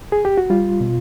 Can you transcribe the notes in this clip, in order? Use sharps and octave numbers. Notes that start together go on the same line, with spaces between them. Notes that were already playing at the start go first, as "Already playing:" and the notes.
G#4
G4
F#4
G3 F4
B2